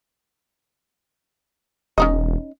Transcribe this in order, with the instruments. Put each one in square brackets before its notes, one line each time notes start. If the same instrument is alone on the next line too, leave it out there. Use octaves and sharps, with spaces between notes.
[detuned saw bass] E1 [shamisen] C#4 D#4 D#5